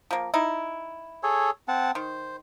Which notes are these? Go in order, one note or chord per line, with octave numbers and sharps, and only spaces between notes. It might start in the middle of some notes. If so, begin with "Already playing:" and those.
F3 A#3
D#4 E4
G#4 A4 C#5
C4 F#5 A5
D#3 C5